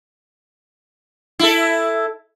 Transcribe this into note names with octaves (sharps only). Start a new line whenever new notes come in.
E4 A4